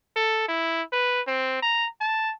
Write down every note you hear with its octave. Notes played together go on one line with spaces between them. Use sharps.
A4
E4
B4
C4
A#5
A5